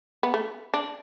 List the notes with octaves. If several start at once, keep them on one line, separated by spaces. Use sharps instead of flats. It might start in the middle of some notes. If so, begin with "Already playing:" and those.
B3
A3
D4